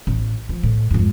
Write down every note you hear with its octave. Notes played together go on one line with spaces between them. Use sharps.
A1
F3
A2
F2 G#2